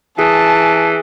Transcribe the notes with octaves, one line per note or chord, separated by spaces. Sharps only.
E3 G#4 A5